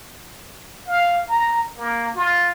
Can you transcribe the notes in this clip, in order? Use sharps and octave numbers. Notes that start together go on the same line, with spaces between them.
F5
A#5
A#3
F4